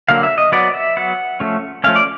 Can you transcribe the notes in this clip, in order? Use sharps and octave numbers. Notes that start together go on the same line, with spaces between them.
D3 F#3 A#3 F5
E5
D#5
F#3 B3 D5
E5
F#3 B3 F#5
F3 A3 C#4
F3 A3 C#4 F5
D5